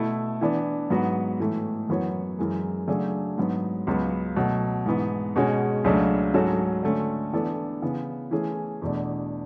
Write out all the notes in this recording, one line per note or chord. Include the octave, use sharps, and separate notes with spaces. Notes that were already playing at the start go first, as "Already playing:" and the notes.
Already playing: B2 A3 E4
E3 B3 D4
G#2 F#3 B3 F#4 B4
A2 E3 A3
F#2 E3 B3 F#4 C#5
F#2 E3 G#3
C#3 F#3 A3 D4 G#4
G#2 F#3 B3
C#2 C#3 F#3 B3
B2 F#3 A3
G#2 E3 B3
B2 G#3 C#4 F#4
C#2 C#3 F#3 A3 D4
G#2 F#3 C#4 F#4 A4
D3 A3 C#4
E3 B3 D4 A4 D5
C#3 E3 B3
E3 A3 C#4 G#4
E2 B2 A3 D4